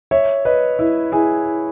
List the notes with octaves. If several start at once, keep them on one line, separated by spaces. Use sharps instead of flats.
C#5 E5
B4 D#5
E4
E4 G#4